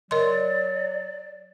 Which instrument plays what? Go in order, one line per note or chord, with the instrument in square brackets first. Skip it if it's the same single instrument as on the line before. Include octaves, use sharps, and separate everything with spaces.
[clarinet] F#3 [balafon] A#4 D#5 C6 [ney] D5